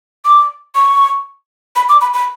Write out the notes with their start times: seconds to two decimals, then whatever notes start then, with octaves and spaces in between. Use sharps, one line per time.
0.25 D6
0.75 C#6
1.76 B5
1.89 D6
2.01 B5
2.14 B5